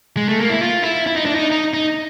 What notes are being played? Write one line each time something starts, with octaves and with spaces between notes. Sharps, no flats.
G#3
A3
A#3
E4
F4
E4
E4
D#4
D4
D#4
D#4
D#4